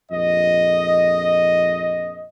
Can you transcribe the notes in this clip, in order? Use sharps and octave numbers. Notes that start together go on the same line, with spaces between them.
A#1 F2 D#5